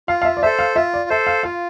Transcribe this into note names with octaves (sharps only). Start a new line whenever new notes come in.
F4 F5
F5
E5
D5
A4 C5 E5
F5
F4 E5
D5
A4 C5 E5
F5
F4 F5